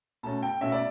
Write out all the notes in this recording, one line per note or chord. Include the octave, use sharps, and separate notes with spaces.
B2 A3 C#4 A5
G5
B2 A3 C#4 E5
D5